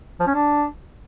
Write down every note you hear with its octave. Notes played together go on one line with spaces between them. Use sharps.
F3
C#4
D4